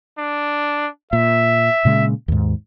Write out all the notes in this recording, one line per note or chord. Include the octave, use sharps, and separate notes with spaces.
D4
A#2 E5
A#2 C#3 G#3
D#2 G#2